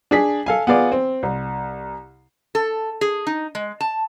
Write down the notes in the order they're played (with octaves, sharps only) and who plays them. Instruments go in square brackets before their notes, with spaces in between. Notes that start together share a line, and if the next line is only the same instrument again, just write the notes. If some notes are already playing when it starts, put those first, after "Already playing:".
[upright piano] D4 G#4 B6
A4 F5 G#5
B3 F4 G#4 D5
C4
C2
[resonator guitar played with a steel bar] A4
G#4
D#4
G#3
A5